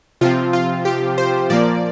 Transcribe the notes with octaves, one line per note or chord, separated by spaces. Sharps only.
C3 F3 C4 F4
F4
G4
C5
A#2 F3 A#3 D5